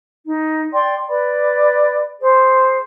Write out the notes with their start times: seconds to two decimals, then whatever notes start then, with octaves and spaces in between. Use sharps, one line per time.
0.26 D#4
0.72 D5 G5 C6
1.07 B4 D5 B5
2.20 G#4 C5